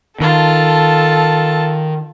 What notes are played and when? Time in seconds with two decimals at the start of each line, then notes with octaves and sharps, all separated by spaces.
0.20 D#3 F4 A4 A5